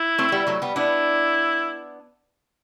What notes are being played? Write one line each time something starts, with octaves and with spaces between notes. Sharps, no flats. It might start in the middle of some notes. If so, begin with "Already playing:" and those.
Already playing: E4
A3 C4
A3
G3 B3
F#3 A3
G3 B3
B3 D4 E4